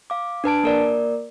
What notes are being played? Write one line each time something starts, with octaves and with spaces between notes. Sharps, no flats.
F5 D6
D4 B4 A5 D7
A#3 A#4 D5